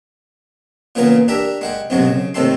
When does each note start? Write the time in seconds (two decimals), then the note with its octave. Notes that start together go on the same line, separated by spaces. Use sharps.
0.95 A#2 C#3 E3 B3 F4 A#4
1.28 D4 G4 A#4 E5
1.61 G#3 F#5 G5
1.90 B1 F#2 C3 F#3 G#3
2.05 C#3
2.34 A2 C3 D#3 A4 C6